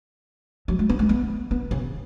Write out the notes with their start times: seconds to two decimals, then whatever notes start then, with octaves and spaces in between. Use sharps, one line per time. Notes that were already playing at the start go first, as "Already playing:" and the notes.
0.68 F#3
0.79 G#3
0.89 B3
0.99 G#3
1.09 B3
1.51 B3
1.71 C#3